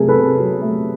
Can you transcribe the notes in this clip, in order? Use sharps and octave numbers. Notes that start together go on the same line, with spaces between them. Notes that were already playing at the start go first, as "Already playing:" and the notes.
Already playing: C3 F#3 A3 G#4 A#4
A4 B4
C3
F#3
A3